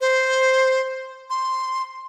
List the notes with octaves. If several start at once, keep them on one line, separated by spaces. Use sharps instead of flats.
C5
C6